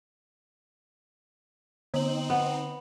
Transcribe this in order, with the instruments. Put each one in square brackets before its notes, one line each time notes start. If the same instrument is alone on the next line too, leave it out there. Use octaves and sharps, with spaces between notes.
[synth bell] D3 F#7 [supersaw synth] C4 D#4
[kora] B3